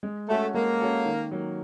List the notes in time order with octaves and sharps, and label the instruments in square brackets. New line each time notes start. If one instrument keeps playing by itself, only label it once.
[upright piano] G#3
[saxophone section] A3 [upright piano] C#4 F#4 A4
[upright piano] G#3 [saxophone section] A#3
[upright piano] C#4 F#4 A4
D#3
F#3 A#3